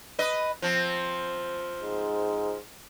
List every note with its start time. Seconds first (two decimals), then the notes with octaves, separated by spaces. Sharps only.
0.19 B4 D#5
0.62 F3 C4
1.82 G#2